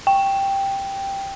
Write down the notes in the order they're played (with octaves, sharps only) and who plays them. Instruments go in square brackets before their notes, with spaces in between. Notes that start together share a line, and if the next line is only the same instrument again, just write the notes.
[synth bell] G5